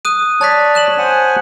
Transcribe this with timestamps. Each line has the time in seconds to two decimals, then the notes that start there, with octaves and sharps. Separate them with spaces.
0.05 D#6 F#6 D#7
0.41 C#5 D5 A5 F#6 B6
0.75 F#6 E7 F#7
0.98 C5 F#5 G#5